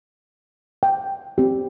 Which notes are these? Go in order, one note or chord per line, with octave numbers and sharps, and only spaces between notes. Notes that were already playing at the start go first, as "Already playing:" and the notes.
G5
C4 G4